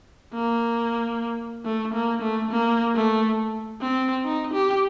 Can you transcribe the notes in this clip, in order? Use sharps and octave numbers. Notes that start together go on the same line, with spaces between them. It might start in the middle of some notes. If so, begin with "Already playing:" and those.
A#3
A3
A#3
A3
A#3
A3
C4
D#4
G4